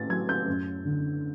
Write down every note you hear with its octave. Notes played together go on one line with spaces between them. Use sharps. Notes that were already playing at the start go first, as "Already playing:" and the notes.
Already playing: A2 A6
F#3 G#6
G6
F#2
D3